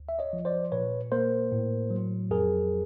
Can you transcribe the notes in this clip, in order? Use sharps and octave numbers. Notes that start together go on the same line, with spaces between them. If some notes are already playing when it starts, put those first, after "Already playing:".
Already playing: D2
E5
C#5 D#5
F3
C5 D5
A#2 B4 C#5
A#3 A#4 C5
A2
F#3
F2 G#4 A#4